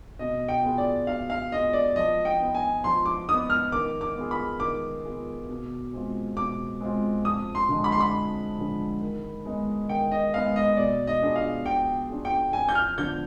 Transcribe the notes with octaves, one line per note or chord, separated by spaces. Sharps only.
B2 D#5
G5
B3 F4 G#4
D5
B2 F5
F5
B3 F4 G#4 D#5
D5
F3 D#5
G5
B3 D#4
G#5
F3 C6
D6
B3 D#4 D#6
F6
D#3 D6
D6
B3 F4 G#4
B5
D#3 D6
B3 F4 G#4
B2
G#3 C4 F4
B2 D6
G#3 C4 F4
F2 D#6
C6
D3 F3 G#3
B5
C6
B5
F2
D3 F3 G#3
D#3
G#3 B3 D#4
D#3 G5
D#5
G#3 B3 D#4 F5
D#5
B2 D5
D#5
B3 D4 F4 G#4
F5
B2 G5
B3 D4 F4 G#4
G5
F2 G#5
G6
F6
D3 F3 B3 D4 G6